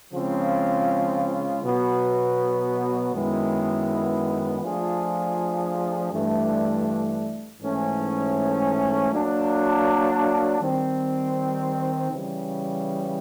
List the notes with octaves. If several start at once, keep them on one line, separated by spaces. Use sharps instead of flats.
C#3 F3 G#3 C4 F4
B2 F#3 B3
F#2 D#3 G#3 B3 E4
F3 A3 D4 F4 G#4
G2 E3 A3 D4
G#2 E3 A3 C#4
F#3 A#3 D4
D#3 G3 C4
C#3 E3 G3